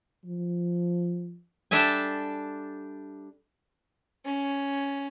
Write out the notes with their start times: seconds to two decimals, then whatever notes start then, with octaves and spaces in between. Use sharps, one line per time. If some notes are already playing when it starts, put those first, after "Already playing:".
0.25 F3
1.71 G3 D4 A4 E5 G#5
4.25 C#4